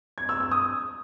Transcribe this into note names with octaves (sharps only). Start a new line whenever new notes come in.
G#6
E6
E6
D#6